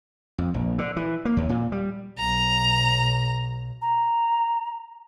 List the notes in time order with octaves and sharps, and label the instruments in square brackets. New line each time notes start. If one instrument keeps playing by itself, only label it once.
[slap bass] F2
A#1
D3
E3
A#3
D#2
A#2
G3
[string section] B1 [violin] A#5
[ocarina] A#5